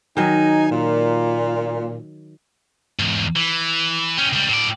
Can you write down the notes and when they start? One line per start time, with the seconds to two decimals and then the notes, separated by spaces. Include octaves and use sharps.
0.17 D#3 F#3 D#4 G#5
0.71 A#2
2.99 E2 G#2
3.36 E3
4.17 C#4 G4
4.33 C#2 G3
4.49 A2 D5